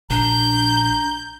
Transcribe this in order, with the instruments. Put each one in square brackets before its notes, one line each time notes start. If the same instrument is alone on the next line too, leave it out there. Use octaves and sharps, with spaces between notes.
[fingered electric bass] A#1 [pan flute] D4 [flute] A#5 [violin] G6